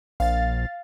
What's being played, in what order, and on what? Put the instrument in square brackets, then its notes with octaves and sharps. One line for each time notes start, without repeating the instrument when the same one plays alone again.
[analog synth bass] A#1 [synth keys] F5 A6